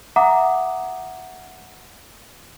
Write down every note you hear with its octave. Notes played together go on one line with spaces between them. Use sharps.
E5 F#5 A#5 D6 D#6